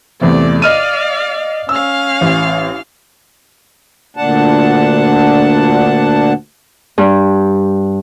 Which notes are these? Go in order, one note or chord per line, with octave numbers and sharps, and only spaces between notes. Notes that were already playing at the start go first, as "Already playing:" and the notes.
E2 C3 A3 D5
D5 D#5 F5 F6 D#7
C#4 F5 E6
A1
D2 A#2 D4 F#5 A5
G2